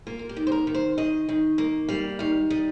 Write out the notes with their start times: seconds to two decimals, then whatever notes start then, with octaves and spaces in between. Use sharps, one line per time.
0.07 A#3 F4
0.19 A#4
0.29 G4
0.36 D#3
0.47 C5
0.52 A#4
0.67 D#3
0.74 C5
0.98 D#3 D#5
1.29 D#3
1.58 A#3
1.89 G3 F5
2.19 D#3 F5
2.50 G3 D#5